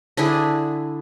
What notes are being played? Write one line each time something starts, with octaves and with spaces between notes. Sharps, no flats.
D3 D4 E4 G#4